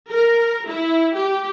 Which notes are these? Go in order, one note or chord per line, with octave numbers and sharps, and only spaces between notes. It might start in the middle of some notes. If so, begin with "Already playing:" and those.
A#4
E4
G4